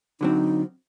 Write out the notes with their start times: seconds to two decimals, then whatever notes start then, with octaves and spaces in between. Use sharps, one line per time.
0.21 D3 F#3 C4 D#4